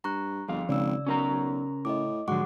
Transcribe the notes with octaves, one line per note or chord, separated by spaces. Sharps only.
G2 A#5 C#6 F#6
G1 F2 G#4 F5
G#1 C#3 D5 E6
B1 C#4 A#4 A#5
A2 D#5 D6
G#2 D3 F3 F#3 G#3 F#5 C#6 D6